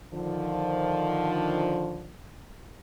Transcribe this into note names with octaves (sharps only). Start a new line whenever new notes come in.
D3 D#3 F3